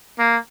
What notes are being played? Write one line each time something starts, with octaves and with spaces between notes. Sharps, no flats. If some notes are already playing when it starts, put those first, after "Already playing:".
A#3